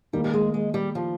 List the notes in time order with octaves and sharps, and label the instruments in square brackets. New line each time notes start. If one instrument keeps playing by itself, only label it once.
[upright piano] D#3 A#3 D#4 [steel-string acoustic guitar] G3
[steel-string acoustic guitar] G3
G#3
G#3
G3
F3